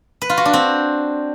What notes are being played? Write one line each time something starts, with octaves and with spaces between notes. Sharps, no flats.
B4
F4
F#4
D4
C4